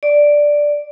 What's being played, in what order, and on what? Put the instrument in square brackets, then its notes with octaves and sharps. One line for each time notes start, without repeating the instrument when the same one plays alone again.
[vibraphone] D5